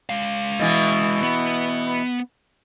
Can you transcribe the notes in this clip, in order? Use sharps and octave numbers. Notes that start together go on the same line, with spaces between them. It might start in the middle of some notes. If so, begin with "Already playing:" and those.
G#3 F5
B2 E3
B3